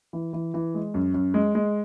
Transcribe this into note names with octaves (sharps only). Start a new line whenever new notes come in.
E3
E3
E3
G#3
F#2
F#2
G#3
G#3